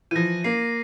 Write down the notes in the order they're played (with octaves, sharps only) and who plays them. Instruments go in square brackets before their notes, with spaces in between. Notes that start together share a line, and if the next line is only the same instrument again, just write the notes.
[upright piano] E3 F3 [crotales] A#6 D#7
[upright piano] A#3 [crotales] C7